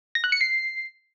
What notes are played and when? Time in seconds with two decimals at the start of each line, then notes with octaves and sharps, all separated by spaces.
0.15 A#6
0.24 F#6
0.32 C#7
0.41 C7